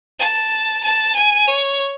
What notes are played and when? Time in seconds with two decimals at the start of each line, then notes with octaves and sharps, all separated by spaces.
0.19 A5
0.84 A5
1.15 G#5
1.48 C#5